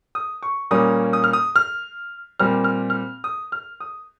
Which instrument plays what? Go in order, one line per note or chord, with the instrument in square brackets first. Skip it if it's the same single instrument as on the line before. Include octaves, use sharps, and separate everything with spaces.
[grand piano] D#6
C#6
A#2 G3 A#3 C#4 D#6
D#6
F6
D#6
F6
A#2 G3 C4 F6
F6
F6
D#6
F6
D#6